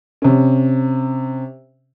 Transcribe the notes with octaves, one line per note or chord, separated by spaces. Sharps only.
C3 C#4